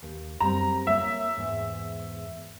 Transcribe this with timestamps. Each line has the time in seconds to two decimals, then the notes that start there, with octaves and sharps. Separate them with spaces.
0.02 D#2
0.41 F#2 G3 C4 A#5
0.87 A#3 F4 C#5 E5
1.37 E2 G#2